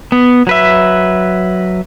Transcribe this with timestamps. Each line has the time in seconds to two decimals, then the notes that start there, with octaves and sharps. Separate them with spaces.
0.12 B3
0.47 F#3 B4 E5